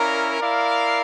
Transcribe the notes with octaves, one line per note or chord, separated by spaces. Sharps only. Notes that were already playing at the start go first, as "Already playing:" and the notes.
Already playing: C#4 E4 A#4 D5 F5
E4 A#4 D5 F5